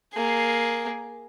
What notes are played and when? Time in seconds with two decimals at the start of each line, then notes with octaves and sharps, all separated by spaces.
0.14 A#3 G#4